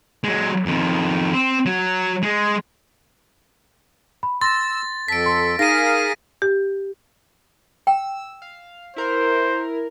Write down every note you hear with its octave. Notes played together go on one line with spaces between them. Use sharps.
F#3 G#3
F2 D#3
C4
F#3
G#3
B5
C6 E6 A6 A#6
F2 A4 B6 D7
C6
D#4 G#4 A#4 F5 A#6 D#7
G4
G5 E6
F5
E4 A#4 C5